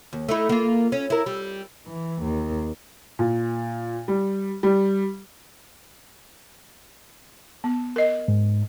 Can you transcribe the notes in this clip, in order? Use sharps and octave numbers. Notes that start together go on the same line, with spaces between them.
D#2
A3 D#4 E4
A#3 F4
C#4
E4 A#4
G3
E3
D#2
A#2
G3
G3
B3
A#4 D#5
G#2